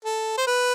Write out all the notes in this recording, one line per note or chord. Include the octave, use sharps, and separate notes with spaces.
A4
C5
B4